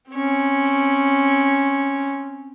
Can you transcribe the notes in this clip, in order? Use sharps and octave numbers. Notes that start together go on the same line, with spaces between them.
C4 C#4